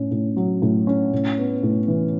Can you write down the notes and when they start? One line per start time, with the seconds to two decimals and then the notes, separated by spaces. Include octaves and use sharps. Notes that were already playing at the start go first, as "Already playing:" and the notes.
Already playing: A2 C#4
0.11 A2
0.37 F#3
0.62 A2
0.87 C#4
1.13 A2
1.38 B3
1.63 A2
1.88 E3